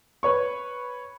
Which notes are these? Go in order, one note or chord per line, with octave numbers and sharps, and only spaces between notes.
B4 C#5 C#6